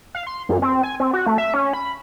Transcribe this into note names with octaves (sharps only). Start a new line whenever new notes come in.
F5
C6
F#2
C4
G#5
C4
F#4
A3
E5
C#4
B5